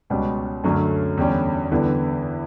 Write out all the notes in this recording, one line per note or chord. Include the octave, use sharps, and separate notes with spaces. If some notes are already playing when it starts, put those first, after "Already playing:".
C#2 B2 G3 C#4 F#4
F#2 D3 F#3 A3 C#4
E2 D3 G3 C#4
E2 D3 G3 B3 E4